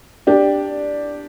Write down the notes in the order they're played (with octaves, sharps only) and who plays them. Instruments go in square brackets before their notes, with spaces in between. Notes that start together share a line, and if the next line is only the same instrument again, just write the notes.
[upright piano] D4 G4